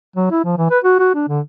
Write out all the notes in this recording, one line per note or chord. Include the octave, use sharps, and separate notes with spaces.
F#3
E4
F3
E3
B4
F#4
F#4
D4
D3